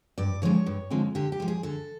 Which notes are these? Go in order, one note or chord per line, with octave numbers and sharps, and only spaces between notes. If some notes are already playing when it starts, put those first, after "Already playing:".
G2 D5
D3 F3 G#3 C4 C#5
G2
D3 F3 G#3 C4
D3 G4
G4
F3 G#3
G#4
D3 A4